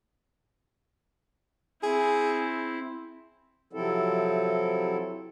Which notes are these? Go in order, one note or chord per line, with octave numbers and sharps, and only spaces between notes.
C4 E4 G#4
C3 F3 F#3 C4 E4 A4